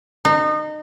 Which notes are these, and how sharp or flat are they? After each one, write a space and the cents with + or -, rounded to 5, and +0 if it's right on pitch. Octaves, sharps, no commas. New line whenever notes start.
D#4 -30